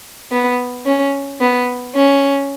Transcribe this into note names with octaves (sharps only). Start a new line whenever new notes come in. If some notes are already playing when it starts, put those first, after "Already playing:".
B3
C#4
B3
C#4